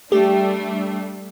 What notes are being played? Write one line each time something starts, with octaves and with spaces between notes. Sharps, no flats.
G3 A3 D4 G4